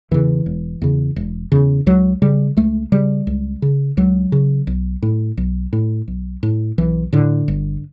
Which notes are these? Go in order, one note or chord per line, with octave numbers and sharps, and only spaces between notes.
E2 C#3 E3
E1
E2 C#3
E1
E2 C#3
C#2 F#3
C#3 G3
C#2 A3
C#3 G3
C#2
C#3
C#2 F#3
C#3
B1
A2
B1
A2
B1
A2
B1 E3
A2 D3
G1